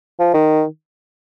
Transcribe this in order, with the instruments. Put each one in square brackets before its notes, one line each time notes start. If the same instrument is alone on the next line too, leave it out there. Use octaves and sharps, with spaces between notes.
[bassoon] F3
D#3